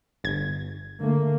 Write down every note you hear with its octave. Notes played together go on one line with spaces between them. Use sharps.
G1 G#6
D3 A3 A#3